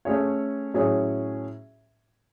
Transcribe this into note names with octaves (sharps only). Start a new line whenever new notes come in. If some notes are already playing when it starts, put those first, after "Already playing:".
A3 C#4 G#4 C#5
A2 F#3 C#4 G#4 C#5